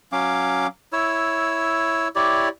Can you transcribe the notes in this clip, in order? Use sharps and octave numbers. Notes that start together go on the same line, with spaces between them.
F#3 C#4 F5 D6
E4 C#5 E6
E4 G4 C#5 D5